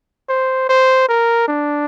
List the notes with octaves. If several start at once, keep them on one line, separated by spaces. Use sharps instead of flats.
C5
C5
A#4
D4